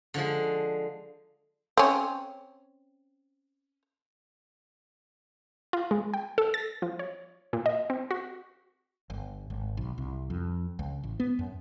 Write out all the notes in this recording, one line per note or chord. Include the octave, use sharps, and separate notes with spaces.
D3 F3 G#3
C4 C#4
F4
G#3
G5
A4
A6
F3
C#5
A#2
D#5
C4
F#4
G1
G#1
B1
C2
F2
C#2
A1
B3
F#2